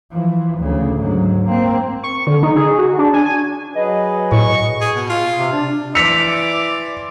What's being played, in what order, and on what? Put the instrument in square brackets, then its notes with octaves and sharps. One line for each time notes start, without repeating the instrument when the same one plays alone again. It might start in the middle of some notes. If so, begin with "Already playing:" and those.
[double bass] E3 F3
D2 C#3
G#2 F#3
A#3 C4
[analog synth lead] C#6
D3
D#4
G#4
F#4
D4
G#5
G#5
[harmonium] F#3 G#4 B4 [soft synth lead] D#5
[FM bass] A2 [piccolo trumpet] C#6
[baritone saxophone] G#4
B2
F4
[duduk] C3
D4
[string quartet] E3 C6 D6 [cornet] D5 [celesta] E6 F7 [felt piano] B6 C#7